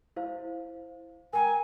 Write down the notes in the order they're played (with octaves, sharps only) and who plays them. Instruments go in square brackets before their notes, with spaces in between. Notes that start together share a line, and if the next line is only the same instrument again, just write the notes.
[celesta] E4 C5 F5
[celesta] A#4 G5 A#5 [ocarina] G#5